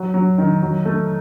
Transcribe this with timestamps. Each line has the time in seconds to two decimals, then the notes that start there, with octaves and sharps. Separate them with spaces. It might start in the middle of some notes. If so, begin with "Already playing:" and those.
Already playing: F#3
0.14 F#3
0.38 D#3
0.62 F#3
0.85 A3